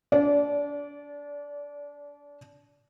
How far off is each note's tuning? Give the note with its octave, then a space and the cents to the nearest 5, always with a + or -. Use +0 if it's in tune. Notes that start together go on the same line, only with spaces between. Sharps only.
D4 -30 D5 -20